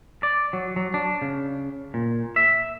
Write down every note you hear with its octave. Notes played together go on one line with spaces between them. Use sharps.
D5
F#3
F#3
D4
C#3
A#2
E5